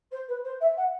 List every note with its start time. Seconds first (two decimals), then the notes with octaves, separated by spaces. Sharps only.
0.11 C5
0.28 B4
0.44 C5
0.60 E5
0.76 F#5